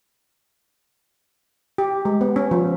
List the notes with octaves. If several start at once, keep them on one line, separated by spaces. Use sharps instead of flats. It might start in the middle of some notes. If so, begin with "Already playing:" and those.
G4
G#3
B3
C#4
F3